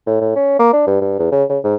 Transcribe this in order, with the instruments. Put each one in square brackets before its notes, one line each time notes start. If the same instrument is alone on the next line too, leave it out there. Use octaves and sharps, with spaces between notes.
[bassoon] A2
A2
C#4
A#3
D4
G2
G2
E2
C#3
C#3
G#2